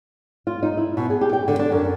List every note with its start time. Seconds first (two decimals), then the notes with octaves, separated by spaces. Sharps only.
0.47 F4
0.63 D#4
0.77 E4
0.97 B2
1.10 G#4
1.21 G4
1.33 G5
1.48 D3
1.59 D4
1.72 F#2